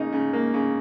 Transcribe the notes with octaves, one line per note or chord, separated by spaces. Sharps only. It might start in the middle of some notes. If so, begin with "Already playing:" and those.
Already playing: C#3 A#3 D#4
C#3
A#3
C#3